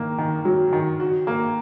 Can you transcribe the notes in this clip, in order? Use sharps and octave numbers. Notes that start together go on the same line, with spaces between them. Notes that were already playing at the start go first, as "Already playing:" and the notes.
Already playing: D#3 A#3
D#3
F#3
D#3
F#4
A#3